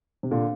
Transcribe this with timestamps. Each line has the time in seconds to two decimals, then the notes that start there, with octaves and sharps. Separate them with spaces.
0.23 C3
0.31 A#2 D3